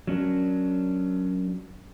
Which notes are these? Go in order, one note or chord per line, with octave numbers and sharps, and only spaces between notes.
F#3 C#4 D4 A#4